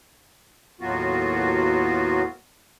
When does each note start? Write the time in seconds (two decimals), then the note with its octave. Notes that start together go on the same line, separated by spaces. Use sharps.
0.81 D#2 A2 F#3 B3 F4 F#4